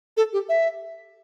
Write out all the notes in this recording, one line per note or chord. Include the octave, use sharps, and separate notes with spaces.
A4
G4
E5